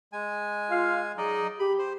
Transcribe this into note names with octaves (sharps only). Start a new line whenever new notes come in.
G#3 G#5
F4 F5
F#3 D#4 G#4 D5 D#5
G4 B5
C5